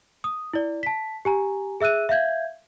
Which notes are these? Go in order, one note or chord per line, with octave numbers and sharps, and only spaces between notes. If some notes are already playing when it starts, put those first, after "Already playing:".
D#6
E4 D5
A5 B6
G4 G#5 A#5
G#4 E5 E6 F#6 D#7
E5 F5 G6 G#6